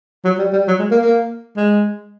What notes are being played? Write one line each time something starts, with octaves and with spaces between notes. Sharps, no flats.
F#3
G3
G3
F#3
G#3
A#3
A#3
G#3